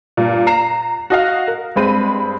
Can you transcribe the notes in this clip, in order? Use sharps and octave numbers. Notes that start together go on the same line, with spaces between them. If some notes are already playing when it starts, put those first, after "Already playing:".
G2 A#2
A#5 C7 E7
F#4 D#5 F5
A#4
G2 G#3 C4 B5 D#7